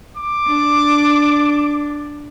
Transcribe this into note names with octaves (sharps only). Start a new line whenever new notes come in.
D6
D4